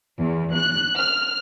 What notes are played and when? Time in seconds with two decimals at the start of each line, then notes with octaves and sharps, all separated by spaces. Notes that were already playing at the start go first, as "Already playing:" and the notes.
0.19 E2
0.55 F#6
0.97 F6